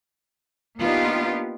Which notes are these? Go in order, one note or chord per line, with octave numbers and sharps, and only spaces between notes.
A#3 B3 D4 D#4 F4 G4